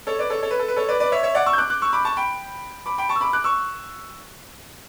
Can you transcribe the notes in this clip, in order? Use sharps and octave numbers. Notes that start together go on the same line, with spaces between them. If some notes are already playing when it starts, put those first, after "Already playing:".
A4 C#5
B4 D5
A4 C#5
A4 C#5
B4
A4
B4
A4 C#5
B4 D5
B4 D5
C#5 E5
C#5 E5
D5 F#5
C#6 E6
G6
D6 F#6
D6 F#6
C#6 E6
B5 D6
A5 C#6
G5 B5
B5 D6
G5 B5
A5 C#6
E6
B5 D6
D6 F#6
C#6 E6